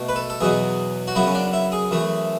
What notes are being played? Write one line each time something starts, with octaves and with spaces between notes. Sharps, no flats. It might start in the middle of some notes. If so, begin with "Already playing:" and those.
Already playing: B2 A3
B4
A4
A4
E2 B2 F#3 B3 G#4
F#4
F#2 C#3 F#3 B3 E4
C#4
D4
E4
G#4
F#2 E3 A3